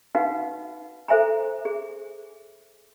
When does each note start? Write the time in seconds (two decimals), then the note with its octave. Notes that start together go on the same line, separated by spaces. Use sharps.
0.15 D#4 F#4 B4 F5 F#5
1.08 A4 C5 E5 G#5 A#5
1.65 G#4